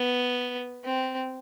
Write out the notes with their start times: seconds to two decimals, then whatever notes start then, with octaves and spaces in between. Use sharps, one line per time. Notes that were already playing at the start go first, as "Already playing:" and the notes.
Already playing: B3
0.84 C4